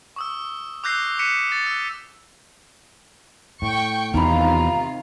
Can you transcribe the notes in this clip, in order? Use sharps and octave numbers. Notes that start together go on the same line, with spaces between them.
C#6 D#6 E6
D6 E6 F#6 G6 A#6 C7
D6 F#6 B6 C#7 D#7 E7
A6
E6 F#6
A2 G5 C#6
E2 C3 D#3 D#4 F4 A#5 B5